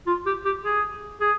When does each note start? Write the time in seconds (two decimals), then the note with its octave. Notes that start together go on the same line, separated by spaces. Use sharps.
0.07 F4
0.26 G4
0.45 G4
0.64 G#4
1.21 G#4